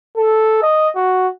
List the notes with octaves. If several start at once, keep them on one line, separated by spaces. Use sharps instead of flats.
A4
D#5
F#4